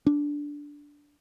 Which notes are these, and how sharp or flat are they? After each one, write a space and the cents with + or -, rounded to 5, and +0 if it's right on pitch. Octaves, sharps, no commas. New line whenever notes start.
D4 -10